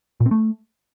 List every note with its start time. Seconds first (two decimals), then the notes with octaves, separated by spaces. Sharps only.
0.20 A#2
0.26 C4
0.31 A3